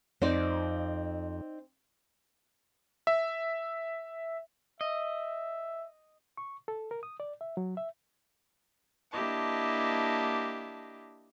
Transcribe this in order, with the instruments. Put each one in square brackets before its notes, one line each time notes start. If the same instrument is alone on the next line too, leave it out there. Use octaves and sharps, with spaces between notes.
[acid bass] F2 [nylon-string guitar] C4 D#4 D5
[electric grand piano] E5
[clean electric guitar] D#5 [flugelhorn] E5
[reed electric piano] C#6
A4
A#4
D#6
D5
E5
F#3
E5
[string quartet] A#3 D4 E4 G4 D#5 A5